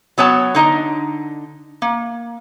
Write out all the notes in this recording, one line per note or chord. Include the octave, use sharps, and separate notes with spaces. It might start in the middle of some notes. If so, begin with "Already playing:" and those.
F#3 B3 C#5 A5
D3 D#4 D#5
A#3